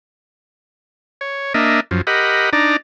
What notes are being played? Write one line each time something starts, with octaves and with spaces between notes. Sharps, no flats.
C#5
A#3 D4 D#5 E5
F#2 F3
G4 A#4 D#5 F#5 B5
D4 D#4 D5 A#5